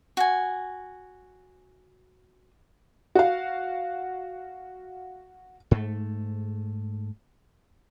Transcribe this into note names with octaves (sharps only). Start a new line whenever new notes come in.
F#4 G#5
F#4 F5
G#2 A3